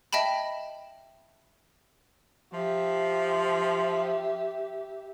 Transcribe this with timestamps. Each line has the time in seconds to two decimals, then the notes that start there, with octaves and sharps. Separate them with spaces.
0.13 D#5 E5 G5 A5 B5
2.53 F3 G4 E5